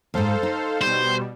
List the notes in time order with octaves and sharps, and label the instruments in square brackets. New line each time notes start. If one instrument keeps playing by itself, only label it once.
[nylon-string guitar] D#2 G#2 [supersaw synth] A4 C5 F5
[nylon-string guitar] D#4
[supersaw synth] B2 G3 [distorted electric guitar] C5